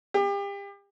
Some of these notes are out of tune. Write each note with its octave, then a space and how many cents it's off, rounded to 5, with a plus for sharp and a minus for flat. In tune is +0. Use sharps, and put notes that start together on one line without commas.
G4 +35